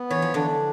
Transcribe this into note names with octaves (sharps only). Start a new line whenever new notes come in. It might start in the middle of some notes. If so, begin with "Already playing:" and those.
Already playing: B3
E3 C#5
F3
D3 E3 D4